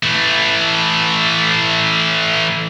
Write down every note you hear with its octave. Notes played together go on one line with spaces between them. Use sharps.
E3 A3